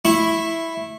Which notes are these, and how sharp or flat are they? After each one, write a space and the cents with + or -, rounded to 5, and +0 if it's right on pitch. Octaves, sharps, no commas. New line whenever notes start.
E4 +0 C#6 -25